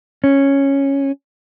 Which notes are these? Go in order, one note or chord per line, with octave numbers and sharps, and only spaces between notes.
C#4